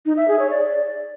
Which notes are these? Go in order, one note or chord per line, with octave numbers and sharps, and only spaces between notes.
D#4
E5
G#4
C#5
D5